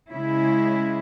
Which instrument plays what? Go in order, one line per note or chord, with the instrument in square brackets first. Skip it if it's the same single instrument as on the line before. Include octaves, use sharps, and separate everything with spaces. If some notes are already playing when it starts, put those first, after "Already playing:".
[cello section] C#3 G#3 C#4 E4